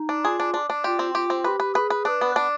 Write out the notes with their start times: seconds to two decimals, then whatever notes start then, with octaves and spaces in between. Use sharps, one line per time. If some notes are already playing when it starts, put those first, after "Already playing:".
Already playing: D#4
0.09 D4
0.24 F4 G#4
0.40 D4
0.54 D4
0.70 D4
0.84 F4 G4
0.99 C4
1.15 F4 G4
1.30 C4
1.44 G4 B4
1.60 B4
1.75 G#4 B4
1.90 B4
2.05 D4 B4
2.21 B3
2.36 D4